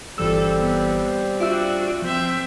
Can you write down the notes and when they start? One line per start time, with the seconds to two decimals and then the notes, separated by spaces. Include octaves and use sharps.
0.18 G1 E3 G3 C4 A4 E6
0.56 B3
1.40 D4 F4 F#4 E5 E6
2.02 F3 C4 E5